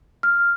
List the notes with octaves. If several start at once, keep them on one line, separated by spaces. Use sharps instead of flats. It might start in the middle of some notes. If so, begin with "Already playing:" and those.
F6